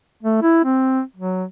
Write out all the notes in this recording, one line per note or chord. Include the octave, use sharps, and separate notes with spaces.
A3
E4
C4
F#3